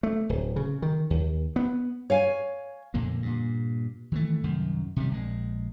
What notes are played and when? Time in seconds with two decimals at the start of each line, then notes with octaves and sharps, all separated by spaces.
0.03 A3
0.29 D1
0.56 C#3
0.82 D#3
1.10 D#2
1.56 B3
2.10 C#5 F5 G#5
2.94 F2 A#2 D3 A#3
3.22 G2 A#2
4.12 D#3 E3 G3 A3
4.43 C2 F#2 D#3
4.96 C3 D#3 G3
5.11 A#1 G#3